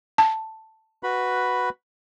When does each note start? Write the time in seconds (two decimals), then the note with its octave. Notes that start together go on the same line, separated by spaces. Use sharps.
0.18 A5
1.03 F#4 B4 B5